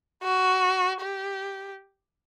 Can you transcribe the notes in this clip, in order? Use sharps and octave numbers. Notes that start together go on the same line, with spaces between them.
F#4
G4